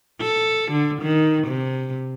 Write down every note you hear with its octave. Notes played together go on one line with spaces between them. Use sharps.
A4
D3
D#3
C3